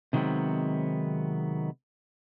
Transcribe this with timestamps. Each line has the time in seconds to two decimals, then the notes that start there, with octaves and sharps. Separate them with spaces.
0.13 C3 D#3 F#3 G#3 B3 C4